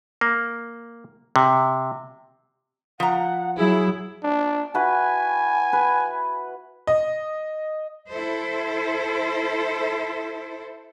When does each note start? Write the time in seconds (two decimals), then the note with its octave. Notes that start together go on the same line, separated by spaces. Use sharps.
0.21 A#3
1.36 C3
3.00 F3 F#5 A#5
3.57 F#3 E4 G#4
4.24 D4
4.74 E4 F#4 B4 G#5
5.73 B4
6.87 D#5
8.10 E4 A4 C5